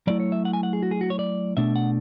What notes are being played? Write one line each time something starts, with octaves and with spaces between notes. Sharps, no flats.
F#3 A3 E4 D5
C#5
E5
F#5
G#5
F#5
G#4
F#4
G#4
F#4
C#5
D5
B2 A3 D4 E5
F#5